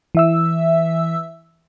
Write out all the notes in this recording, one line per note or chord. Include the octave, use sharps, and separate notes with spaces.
E3 E5 E6